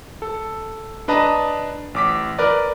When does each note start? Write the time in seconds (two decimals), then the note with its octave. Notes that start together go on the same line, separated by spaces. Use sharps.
0.22 A4
1.08 D4 B4 D#5 A5 A#5
1.94 A1 D6 B6
2.38 A#4 B4 D5